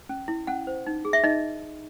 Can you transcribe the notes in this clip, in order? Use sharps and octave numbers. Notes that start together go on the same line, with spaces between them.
C#4
E4
C#4 F#5
C5
D#4
G#4
E5
D#4 D#5